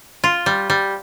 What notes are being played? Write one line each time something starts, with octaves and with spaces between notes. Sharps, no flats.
F4
G3
G3